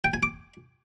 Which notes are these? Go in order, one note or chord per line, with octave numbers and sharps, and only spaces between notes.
G5
G#5
D6